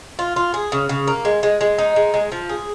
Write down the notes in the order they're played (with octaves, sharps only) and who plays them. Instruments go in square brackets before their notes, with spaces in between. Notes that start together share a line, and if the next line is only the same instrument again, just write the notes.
[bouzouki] F4
F4
G#4
C#3
C#3
A#3
G#3
G#3
G#3
D#4
G#3
G#3
F3
G#4